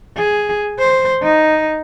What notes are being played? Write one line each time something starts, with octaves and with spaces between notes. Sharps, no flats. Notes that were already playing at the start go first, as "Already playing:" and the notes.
G#4
C5
D#4